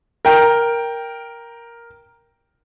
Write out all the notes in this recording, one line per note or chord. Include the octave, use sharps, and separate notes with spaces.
A#4 G5